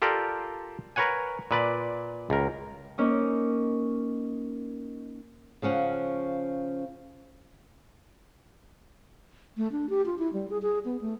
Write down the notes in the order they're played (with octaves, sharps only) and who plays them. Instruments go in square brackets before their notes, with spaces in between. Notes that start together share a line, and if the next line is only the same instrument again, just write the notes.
[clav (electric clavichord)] F4 G4 A4 A#4 D5
A#4 B4 C#5 F#5 G#5
A#2 B4 D5
C#2 A#4
[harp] A#3 C#4 D#4
[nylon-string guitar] C#3 F3 C#4 F#5
[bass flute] A3
D4
G4
F4
E4
G3
G#4
G#4
B3
A3